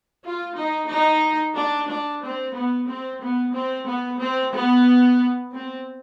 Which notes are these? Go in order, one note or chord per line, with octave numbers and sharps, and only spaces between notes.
F4
D#4
D#4
D4
D4
C4
B3
C4
B3
C4
B3
C4
B3
C4